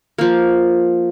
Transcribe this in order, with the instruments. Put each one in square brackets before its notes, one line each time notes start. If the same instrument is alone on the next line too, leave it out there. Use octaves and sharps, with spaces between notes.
[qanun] F3 A#3